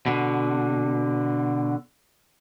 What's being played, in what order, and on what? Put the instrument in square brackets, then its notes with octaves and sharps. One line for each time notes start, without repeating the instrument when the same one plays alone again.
[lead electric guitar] B2 D3